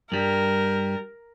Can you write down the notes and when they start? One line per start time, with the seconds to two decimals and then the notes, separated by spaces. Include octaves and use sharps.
0.12 G2 G3 A#4